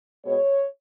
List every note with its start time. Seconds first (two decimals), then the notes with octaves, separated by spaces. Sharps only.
0.25 B2 G#3 C#5